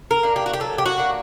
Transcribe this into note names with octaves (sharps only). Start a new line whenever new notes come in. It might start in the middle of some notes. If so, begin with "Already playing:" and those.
A#4
A#3 D4
G4
F#4
G4
F#3 A4
G4
F#4
A#3 D4